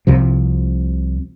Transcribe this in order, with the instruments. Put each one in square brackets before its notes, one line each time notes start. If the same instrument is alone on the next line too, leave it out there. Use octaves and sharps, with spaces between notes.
[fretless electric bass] C2 C3 F3